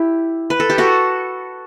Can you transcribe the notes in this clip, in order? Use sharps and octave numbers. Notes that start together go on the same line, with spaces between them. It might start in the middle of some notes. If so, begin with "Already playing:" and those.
Already playing: E4 G4
B4
A4
G4
F#4 A4